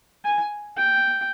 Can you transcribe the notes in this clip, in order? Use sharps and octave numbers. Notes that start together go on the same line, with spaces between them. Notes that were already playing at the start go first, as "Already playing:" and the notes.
G#5
G5